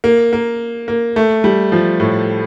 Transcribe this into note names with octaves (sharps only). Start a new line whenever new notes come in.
A#3
A#3
A#3
A3
G3
F3
A2